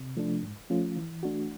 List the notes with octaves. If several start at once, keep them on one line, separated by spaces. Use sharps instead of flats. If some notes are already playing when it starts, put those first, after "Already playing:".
Already playing: C3
F3 A3 D4
G#2
F3 A3 C#4 F4
E3
A3 D4 F#4